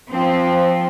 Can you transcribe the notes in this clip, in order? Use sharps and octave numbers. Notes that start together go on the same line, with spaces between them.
F3 C4